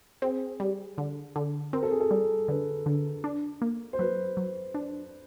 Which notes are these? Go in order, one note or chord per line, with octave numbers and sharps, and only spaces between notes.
C4 G#4
G3
D3
D3
C4 A#4
A4
G#4
A4
G3
D3 B4
D3
D4
A#3
C5
F#3 B4
F#3
D4